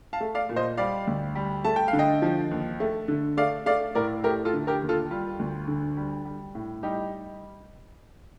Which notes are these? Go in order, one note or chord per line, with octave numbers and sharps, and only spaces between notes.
F5 A5
A3
D5 F5
A#2
C5 D#5
G3 D5 F5
D2
G3
A3 A5
G5
F5
D3
D#5 G5
F3
D#2
A3
D3
A3 D5 F5
A3 D5 F5
A2 A#4 D5
A3 G4 A#4
F4 A4
D3
G4 A#4
D#2
F4 A4
G3 F4
D2
D3
G3
G3
A2
G3 D#4 G4